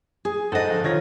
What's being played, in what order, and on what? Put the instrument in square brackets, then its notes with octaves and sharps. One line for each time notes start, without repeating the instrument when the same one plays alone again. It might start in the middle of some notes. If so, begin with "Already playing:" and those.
[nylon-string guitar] G#4
[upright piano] G#2 A6 [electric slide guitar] A4 F#5 [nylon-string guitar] C5 D#5
[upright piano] G1 F3
[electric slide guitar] D#3 F4 [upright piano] C#5 G#6 A#6